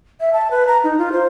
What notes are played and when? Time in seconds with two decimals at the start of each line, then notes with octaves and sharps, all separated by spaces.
0.20 E5
0.33 A5
0.51 B4
0.67 A#5
0.84 D#4
0.98 F4
1.12 C5